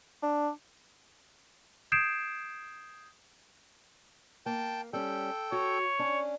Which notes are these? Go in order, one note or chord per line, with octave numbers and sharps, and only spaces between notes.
D4
D#6 G6 G#6 C7 D7 E7
A#3 G5 A5
G3 C#4 A4 G5
F#4 C#5
C#4 D4